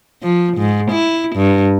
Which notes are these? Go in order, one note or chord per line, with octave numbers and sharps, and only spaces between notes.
F3
G#2
E4
G2